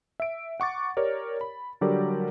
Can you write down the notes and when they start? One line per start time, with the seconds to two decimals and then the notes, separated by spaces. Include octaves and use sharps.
0.20 E5 D7
0.60 F#5 C#6 D6 A6
0.97 G4 A#4 C#5 D5
1.41 B5
1.81 D3 F#3 G3 G4 A#4 D5